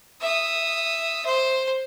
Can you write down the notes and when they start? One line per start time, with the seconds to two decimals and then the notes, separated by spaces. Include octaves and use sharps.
0.21 E5 D#6
1.25 C5